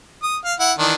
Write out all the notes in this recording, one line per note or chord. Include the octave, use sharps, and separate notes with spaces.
D#6
F5
E4 F#5
D#3 E3 D4